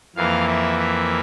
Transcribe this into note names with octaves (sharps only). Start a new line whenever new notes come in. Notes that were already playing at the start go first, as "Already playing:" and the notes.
F2 E3 A#3 F5
E5
E5